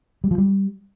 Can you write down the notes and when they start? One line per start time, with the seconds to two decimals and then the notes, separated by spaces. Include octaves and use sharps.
0.24 G3
0.31 F3
0.38 G3